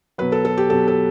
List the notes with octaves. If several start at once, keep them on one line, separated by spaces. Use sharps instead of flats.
B2 F#3 B4
A4
A4
G4
B2 F#3 A4
A4